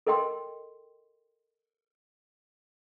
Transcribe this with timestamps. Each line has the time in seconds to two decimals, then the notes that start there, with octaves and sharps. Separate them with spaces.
0.07 A4 A#4 D#5 G5 C6